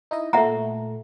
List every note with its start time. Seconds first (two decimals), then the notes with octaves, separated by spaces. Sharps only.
0.11 D#4 E4 D#5
0.33 A#2 A3 E5 F#5 A#5